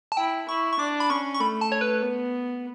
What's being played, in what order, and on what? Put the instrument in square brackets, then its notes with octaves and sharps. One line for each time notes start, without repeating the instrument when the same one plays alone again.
[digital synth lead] A5
[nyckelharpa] E4 [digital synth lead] G5
[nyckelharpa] E4 [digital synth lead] C#6
[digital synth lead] C#6
[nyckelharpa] D4 [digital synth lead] D6
[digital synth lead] B5
[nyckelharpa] C#4 [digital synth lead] C#6
[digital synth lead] C#6
[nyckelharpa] A3 [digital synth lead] B5
[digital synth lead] A5
C#5
B4
[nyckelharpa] B3